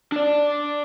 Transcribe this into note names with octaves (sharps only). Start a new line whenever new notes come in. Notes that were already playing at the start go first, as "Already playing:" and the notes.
D4 D5